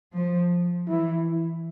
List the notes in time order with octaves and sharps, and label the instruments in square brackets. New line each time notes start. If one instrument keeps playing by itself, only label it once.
[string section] F3
[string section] E3 [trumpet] E4